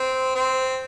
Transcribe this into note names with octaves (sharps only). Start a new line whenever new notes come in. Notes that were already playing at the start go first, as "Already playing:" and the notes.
Already playing: C4
C4